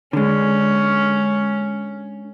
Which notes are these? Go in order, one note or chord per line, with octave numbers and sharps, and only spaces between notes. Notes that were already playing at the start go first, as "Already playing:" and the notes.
D3 G#3 C#4